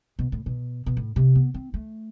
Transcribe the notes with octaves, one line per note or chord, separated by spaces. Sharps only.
B2
A2
B2
B2
A2
C3
B3
C4
A3